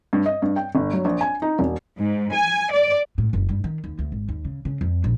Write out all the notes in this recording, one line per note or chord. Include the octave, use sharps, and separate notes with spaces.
G2
D#5
G2
G5
G1
F#3
A#1
G#5
D#4
E1
G#2
G#5
D5
A2
F#1
G2
D#3
D#2
D2
G#1
D#2
C#3
C#3
F2
A#1